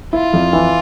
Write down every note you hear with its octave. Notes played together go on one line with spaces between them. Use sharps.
E4 F4
F2
E3